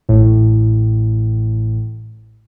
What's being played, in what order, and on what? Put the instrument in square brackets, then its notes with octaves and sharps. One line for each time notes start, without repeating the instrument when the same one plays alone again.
[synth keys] A1 A2